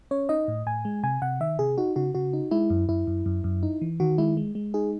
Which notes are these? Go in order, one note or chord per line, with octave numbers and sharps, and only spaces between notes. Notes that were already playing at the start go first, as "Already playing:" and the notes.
C#4 C#5
D#4 D#5
A2
A2 G#5
G#3
C3 G#5
C3 F#5
D#3 E5
C3 G#4
D#4 F#4
C#3 F#4
C#3 F#4
D#4
G#3 E4
F#2
F#2 E4
F#2
F#2
F#2
D#4
E3
D#3 F#4
G#3 E4
G#3
G#3
D#4 G#4